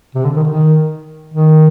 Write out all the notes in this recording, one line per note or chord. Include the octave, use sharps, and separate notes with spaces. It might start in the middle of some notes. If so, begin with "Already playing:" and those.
C3
D3
D#3
D#3
D#3